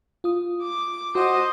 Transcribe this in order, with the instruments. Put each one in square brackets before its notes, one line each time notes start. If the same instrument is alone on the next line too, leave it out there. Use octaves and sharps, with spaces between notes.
[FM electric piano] F4 D#6
[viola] D6
[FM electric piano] F#4 F#5 [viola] C5 D#5